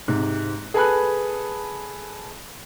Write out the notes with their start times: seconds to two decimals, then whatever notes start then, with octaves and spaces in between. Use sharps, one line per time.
0.08 G#2 C3
0.74 G#4 A4 B4 G#5 B5 F#6